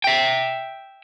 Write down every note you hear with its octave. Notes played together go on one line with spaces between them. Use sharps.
E5 G5